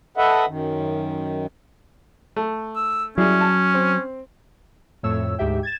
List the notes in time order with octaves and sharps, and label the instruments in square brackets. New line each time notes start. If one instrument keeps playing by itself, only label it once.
[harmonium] A4 B4 D#5 E5 F#5
F#2 D#3
[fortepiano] A3
[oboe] E6
[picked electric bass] F#3 [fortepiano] G3 E4 G#4 [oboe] C#4
[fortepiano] A5
C4
[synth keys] F2 A2 A3 C#5 E6
D2 G#2 G4 E5 G5
G#6 A6 E7